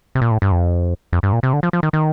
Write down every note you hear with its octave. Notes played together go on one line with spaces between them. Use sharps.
C3
A#2
A2
G2
F2
F2
G2
A#2
C3
D3
F3
F3
D#3
D#3